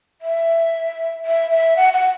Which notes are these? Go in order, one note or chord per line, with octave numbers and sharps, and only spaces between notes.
E5
E5
E5
F#5
F#5